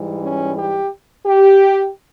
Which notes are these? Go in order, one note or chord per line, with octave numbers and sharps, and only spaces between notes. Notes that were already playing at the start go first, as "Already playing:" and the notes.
Already playing: G#2 E3 G3
C#4
G4
G4